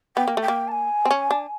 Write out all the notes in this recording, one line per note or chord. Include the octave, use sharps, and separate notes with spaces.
B3 G5
A#3
A3 G5
A#3
A5
G#5
C4
C#4
D4